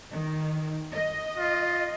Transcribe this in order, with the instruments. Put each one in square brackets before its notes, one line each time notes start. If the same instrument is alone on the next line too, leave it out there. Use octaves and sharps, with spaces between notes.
[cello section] D#3
D#5
[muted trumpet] F4